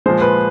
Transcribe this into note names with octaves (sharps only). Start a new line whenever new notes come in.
A#2 F3 G#3 C5
B4